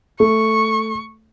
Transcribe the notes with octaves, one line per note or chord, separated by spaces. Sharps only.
A3 C#6